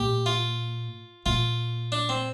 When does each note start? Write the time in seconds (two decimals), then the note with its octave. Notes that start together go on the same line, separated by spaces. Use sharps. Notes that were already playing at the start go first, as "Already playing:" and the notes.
Already playing: A#2 G4
0.26 F4
1.26 A#2 F4
1.92 D4
2.09 C4